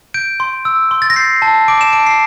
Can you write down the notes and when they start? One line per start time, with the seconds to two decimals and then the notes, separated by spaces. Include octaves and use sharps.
0.14 G6 D7
0.40 C6
0.65 E6
0.91 C6
1.02 A6
1.10 A#6
1.16 G6 C7
1.42 A5
1.68 D6 D7
1.81 E7
1.93 A5 D7
2.06 C7